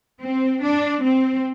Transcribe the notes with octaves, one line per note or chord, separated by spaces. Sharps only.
C4
D4
C4